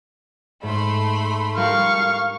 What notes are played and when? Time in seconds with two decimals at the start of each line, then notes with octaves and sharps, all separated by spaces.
0.63 G#2 A3 B5 C6
1.57 G3 G4 A#4 F5 C#6